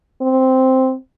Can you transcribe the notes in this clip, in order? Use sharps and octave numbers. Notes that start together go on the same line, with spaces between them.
C4